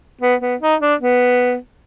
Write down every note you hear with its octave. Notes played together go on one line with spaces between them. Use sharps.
B3
B3
D#4
D4
B3